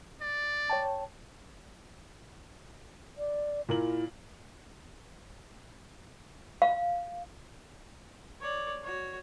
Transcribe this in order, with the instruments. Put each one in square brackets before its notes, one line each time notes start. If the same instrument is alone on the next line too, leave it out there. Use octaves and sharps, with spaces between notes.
[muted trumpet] D5
[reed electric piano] C#5 G5 A5
[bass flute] D5
[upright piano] A#2 A#4 F#7 [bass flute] E4
[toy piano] F5
[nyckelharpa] C#5 D5
F#4 C#5